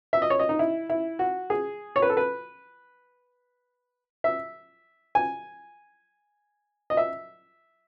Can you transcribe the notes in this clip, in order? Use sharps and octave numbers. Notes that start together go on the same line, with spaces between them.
E5
D#5
C#5
D#5
D#4
E4
E4
F#4
G#4
C#5
B4
A4
B4
E5
G#5
D#5
E5